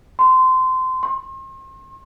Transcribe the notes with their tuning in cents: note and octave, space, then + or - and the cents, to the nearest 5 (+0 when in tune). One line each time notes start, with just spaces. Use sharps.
C6 -20
C6 +40